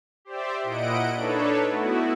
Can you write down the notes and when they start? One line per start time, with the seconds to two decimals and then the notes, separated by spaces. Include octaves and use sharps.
0.25 G4 C5 D5 E5
0.63 A#2 E4 D#5 F#5 D7
1.15 D4 D#4 A4 B4 C#5
1.68 A3 B3 E4 F#4